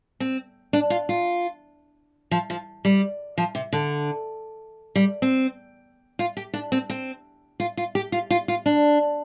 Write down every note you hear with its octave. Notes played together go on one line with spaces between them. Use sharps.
C4
D4
F4
F4
F3
F3
G3
F3
C3
D3
G3
C4
F4
G4
D4
C4
C4
F4
F4
G4
F4
F4
F4
D4